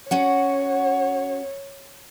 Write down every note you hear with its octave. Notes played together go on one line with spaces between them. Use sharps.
C#4 F#4 C#5 F#5